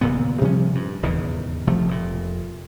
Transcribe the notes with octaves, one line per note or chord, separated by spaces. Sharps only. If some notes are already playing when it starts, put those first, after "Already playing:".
D#1 A#2 C#3 B3
C3 F3 G3 C#4
G2
D#1 E2 G#2 C#3
F1 C3 F3 A3
F1 A#2